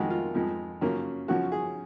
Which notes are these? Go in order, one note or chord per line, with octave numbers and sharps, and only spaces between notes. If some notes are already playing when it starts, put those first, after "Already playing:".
Already playing: F2 D#3 G#3 F#4
F4
F2 F3 G#3
F#2 C#3 F3 A#3
F#2 C#3 F3 F#4
G#4